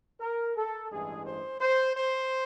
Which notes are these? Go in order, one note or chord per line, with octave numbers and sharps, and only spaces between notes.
A#4
A4
A1 G2 E3 G#3 G#4
C5
C5
C5